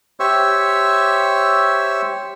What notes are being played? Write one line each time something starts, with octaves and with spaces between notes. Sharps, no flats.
G4 C5 C#5 E5 C#6 E6